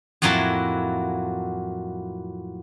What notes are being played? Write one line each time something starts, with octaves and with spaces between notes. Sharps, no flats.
F2 A2 F#3 A#3 E4 A5